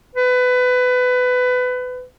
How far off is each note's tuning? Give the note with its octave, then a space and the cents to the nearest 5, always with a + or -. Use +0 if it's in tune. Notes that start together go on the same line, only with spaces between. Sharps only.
B4 +20